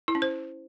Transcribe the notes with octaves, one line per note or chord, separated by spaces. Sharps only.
E4
C#4
C5